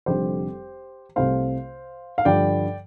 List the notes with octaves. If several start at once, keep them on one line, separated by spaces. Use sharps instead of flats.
F1 F2 D3 G3 G4 C5
C2 C3 A3 C5 F5
F5
G2 D3 F3 D5 G5